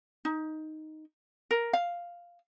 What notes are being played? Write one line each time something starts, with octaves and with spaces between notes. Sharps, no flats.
D#4
A#4
F5